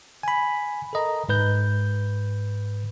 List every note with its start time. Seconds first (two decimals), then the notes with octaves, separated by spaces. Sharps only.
0.23 G#5 B5
0.93 A4 A#4 D#5 A#5
1.29 G#2 B4 G6